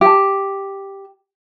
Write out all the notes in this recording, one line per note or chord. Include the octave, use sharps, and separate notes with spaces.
G4 A5